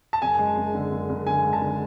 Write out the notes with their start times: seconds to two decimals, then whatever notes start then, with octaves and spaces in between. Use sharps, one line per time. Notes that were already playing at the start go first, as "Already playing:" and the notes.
0.13 A5
0.22 F#1 G#5
0.39 G#3
0.57 F#1
0.74 D3
0.91 F#1
1.09 F#1
1.27 D3 G#5
1.44 G#3
1.53 A5
1.61 D3